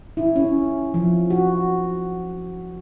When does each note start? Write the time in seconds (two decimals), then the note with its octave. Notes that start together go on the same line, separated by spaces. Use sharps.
0.17 E4
0.36 C#4
0.94 F3
1.30 F#4